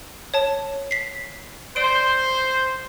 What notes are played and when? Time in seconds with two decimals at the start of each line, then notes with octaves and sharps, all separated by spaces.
0.34 C#5 A5
0.91 B6 C7
1.76 C5 D5 D7